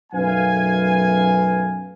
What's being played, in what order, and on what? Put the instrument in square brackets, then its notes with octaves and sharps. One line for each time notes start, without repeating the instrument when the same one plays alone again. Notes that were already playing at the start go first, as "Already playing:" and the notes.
[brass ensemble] B1 F#2 A3 B4 F5 G#5